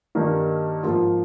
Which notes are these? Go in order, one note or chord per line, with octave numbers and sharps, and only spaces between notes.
G2 D#3 A#3 D#4
G#2 F3 A#3 F4